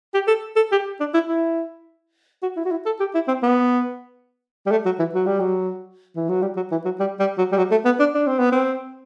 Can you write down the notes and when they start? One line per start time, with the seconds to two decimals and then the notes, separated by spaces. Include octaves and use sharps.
0.14 G4
0.28 A4
0.56 A4
0.72 G4
1.00 D4
1.14 E4
1.28 E4
2.43 F#4
2.57 E4
2.65 F#4
2.71 E4
2.86 A4
3.00 G4
3.15 E4
3.28 C4
3.43 B3
4.67 G3
4.71 A3
4.86 F#3
4.99 E3
5.14 F#3
5.26 G3
5.40 F#3
6.16 E3
6.29 F#3
6.42 G3
6.57 F#3
6.71 E3
6.85 F#3
7.00 G3
7.20 G3
7.38 F#3
7.52 G3
7.58 F#3
7.71 A3
7.85 B3
8.00 D4
8.15 D4
8.27 C4
8.39 B3
8.52 C4